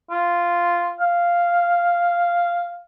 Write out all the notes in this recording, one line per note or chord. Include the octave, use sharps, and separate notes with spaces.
F4
F5